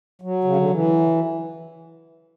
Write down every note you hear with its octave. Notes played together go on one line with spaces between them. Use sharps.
F#3
C#3
D3
E3